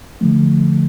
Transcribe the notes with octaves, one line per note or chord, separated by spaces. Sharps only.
D3 F3 A3